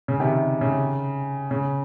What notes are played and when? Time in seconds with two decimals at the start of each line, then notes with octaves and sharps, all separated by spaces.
0.08 C#3
0.20 C3 D#3
0.32 C3
0.61 C#3
1.51 C#3